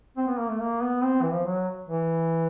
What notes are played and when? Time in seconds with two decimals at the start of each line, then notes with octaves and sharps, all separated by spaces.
0.17 C4
0.27 B3
0.38 A#3
0.49 A3
0.60 A#3
0.81 B3
1.03 C4
1.22 E3
1.33 F3
1.45 F#3
1.88 E3